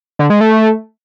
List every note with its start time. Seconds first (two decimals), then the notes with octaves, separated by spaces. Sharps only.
0.19 D3
0.30 G#3
0.41 A3